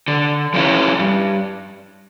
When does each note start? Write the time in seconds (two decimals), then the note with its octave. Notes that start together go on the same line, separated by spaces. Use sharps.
0.08 D3
0.54 F3 C#4 E4
0.99 G2